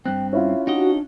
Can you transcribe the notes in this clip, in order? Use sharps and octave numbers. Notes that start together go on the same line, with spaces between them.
G2 C4 G5 F#6
C#4 E4 F4 E5
D4 D#4 F#4 G4 D#5